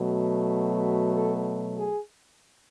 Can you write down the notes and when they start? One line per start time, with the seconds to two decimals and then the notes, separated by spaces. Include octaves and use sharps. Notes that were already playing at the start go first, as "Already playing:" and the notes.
Already playing: B2 F#3 A3
1.12 A4
1.77 G#4